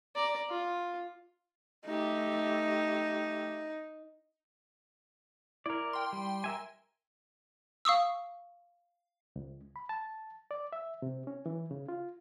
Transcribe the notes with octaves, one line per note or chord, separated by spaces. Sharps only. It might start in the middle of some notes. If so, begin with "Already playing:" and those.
D5 A#5
F4
A3 D#4 G4
E4 A#4 D5
G5 C6
G3
A#4 E5 G#5
F5 C#6 D#6 E6
C#2
B5
A5
D5
E5
C3
C#4
E3
C#3
F4